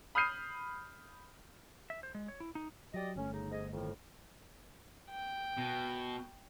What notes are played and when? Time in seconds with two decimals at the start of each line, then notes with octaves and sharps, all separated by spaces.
0.15 B5 D#6 F6 G6 C7 D#7
1.90 E5
2.03 C5
2.15 G#3
2.28 C#5
2.40 E4
2.55 D#4
2.94 F#3 G4 D5 D#5
3.16 G1 A3 C#4
3.32 C#3 D#4
3.51 G#2 G#4 D#5
3.71 F2 A2 D#3
5.10 G5
5.58 B2